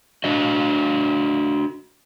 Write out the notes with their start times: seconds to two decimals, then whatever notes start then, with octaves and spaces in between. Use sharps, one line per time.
0.24 D4 F#4 D#5